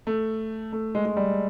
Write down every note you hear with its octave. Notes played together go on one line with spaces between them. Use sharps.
A3
A3
G#3
G#3
G3